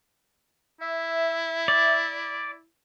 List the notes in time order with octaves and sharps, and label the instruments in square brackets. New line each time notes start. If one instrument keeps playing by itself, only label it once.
[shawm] E4 [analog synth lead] E5
[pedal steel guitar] D5